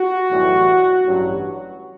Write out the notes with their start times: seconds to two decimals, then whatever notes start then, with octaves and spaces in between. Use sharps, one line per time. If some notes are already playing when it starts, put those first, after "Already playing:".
Already playing: F#4
0.31 B1 A2 E3 G3
1.05 A1 G2 F#3